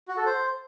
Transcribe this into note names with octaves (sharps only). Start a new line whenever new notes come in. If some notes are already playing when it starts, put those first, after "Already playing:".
F#4
A4
C5